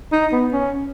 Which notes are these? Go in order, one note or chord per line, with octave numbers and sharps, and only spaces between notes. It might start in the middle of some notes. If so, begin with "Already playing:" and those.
D#4
B3
C#4